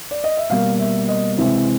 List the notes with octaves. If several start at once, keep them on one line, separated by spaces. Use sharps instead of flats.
D5
D#5
E5
B2 G3 A#3 F5
E5
D#5
C3 E3 G#3 C4 E5